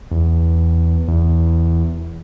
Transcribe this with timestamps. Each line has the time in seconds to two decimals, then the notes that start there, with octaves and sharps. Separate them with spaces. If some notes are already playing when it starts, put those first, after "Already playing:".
0.11 E2
1.08 E2